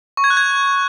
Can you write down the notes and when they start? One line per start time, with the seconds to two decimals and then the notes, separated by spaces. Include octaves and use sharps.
0.17 C#6
0.24 G#6
0.30 F#6
0.37 G#6